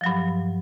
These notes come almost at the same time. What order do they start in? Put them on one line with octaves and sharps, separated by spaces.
F3 F#3 G2